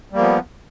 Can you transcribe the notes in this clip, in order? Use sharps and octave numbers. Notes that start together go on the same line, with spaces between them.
F3 G3 A#3 B3